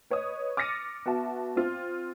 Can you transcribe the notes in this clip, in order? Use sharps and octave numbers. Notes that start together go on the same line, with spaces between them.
B4 C#5 D#5 D#6
D6 F6 A6 A#6 C#7 D#7
B3 F#4 E5 A5
C4 F4